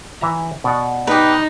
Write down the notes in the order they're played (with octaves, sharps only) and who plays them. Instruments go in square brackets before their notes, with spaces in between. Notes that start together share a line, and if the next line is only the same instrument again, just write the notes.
[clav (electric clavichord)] E3 E5 A#5
B2 D5 F#5
[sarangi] D#4 [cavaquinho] G4 B4